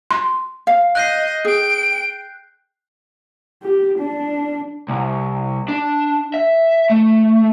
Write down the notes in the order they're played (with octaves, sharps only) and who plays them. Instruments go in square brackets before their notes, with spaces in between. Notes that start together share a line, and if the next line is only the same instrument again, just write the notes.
[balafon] C6
[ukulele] F5
[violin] D#5 [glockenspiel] F#6 G6 C7
[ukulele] G#4 [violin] G5 D7
[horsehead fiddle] G4
D4
[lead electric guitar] C2
D4
E5
A3